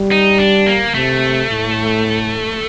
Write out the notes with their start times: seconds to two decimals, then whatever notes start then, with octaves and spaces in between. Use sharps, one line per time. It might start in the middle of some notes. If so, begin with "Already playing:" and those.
Already playing: G3
0.11 D#4
0.39 D4
0.66 A#3
0.94 C3 A3
1.49 A2